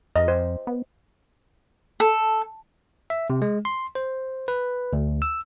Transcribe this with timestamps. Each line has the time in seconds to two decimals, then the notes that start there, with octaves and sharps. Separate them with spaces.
0.16 F2 D#5
0.28 C5
0.67 B3
2.00 A4
3.10 E5
3.30 C3
3.42 G#3
3.65 C6
3.95 C5
4.48 B4
4.93 D2
5.22 E6